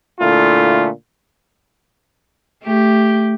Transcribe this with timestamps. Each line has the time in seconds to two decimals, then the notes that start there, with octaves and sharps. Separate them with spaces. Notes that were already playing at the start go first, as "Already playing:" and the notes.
0.20 A#2 D3 A3 E4 F4
2.63 A3 G4